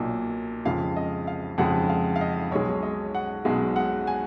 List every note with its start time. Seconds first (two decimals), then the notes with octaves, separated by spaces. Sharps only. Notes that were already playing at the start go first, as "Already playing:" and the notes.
Already playing: B1 A#2 F#3
0.65 F2 C#3 F3 G#3 F5
0.96 D#5
1.27 F5
1.58 F2 C#3 F3 G#3 F#5
1.89 F5
2.16 F5
2.21 D#5
2.51 B1 B2 G#3 C#5
2.83 D#5
3.15 F#5
3.45 B1 B2 G#3 F5
3.76 F#5
4.07 G#5